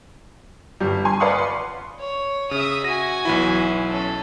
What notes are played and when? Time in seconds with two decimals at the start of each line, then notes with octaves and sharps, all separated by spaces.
0.80 G1 G3
1.05 G#5 C6
1.20 B4 D5 F5 F#5 C6 D#6
1.38 C6
1.99 C#5
2.51 C#3 E5 D#6
2.84 F#4 G#5 A#6
3.25 B1 E3 E4
3.89 C#4 A4